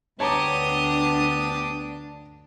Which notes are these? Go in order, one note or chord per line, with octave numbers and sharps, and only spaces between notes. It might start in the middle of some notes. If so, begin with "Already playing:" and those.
D2 B3 D4 G4 C#5 A5 A#5 D#6